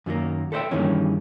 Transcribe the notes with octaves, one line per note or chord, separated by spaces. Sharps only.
F#2 D#3 F#3 A#3
A4 B4 C5 D5 E5 G5
G2 D#3 E3 G#3 A#3 C#4